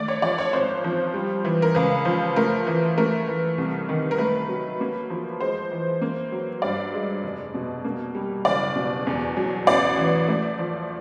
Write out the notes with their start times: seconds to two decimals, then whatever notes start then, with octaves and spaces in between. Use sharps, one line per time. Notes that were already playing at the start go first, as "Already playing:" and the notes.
Already playing: D#3 A3 D5
0.08 C#5
0.22 F3 D5
0.38 C#5
0.53 G#1 C5
0.84 F3
1.14 G3
1.45 E3
1.62 A#4
1.75 C#2 B4
2.05 F3
2.36 A3 A#4
2.67 E3
2.98 A3 A#4
3.28 E3
3.58 C2
3.89 D#3
4.11 A#4
4.18 A3 B4
4.49 F#3
4.80 A#3
5.10 F3
5.41 G#3 C5
5.71 E3
6.01 A#3
6.32 F#3
6.62 G2 D5
6.94 G#3
7.23 F1
7.54 B2
7.84 A#3
8.15 G3
8.45 F#1 D5
8.76 B2
9.07 E2
9.37 F#3
9.67 A1 D5
9.98 E3
10.28 A3
10.59 F3